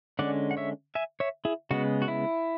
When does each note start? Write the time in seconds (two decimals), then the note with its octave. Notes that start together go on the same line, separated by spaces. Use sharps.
0.19 D3 G#3 C#4 D5 F#5
0.51 F#5
0.57 C#5 E5
0.95 E5 G#5
1.20 C#5 E5
1.45 E4 G#4
1.71 C#3 G#3 B3 F#4
2.02 F#4
2.08 E4